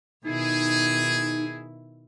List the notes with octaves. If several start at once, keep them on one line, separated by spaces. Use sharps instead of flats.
B2 D#3 D#4 E4 G#4